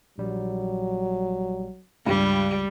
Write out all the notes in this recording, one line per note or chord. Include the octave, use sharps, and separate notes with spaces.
A#1 F#3 G3
C#2 G2 G3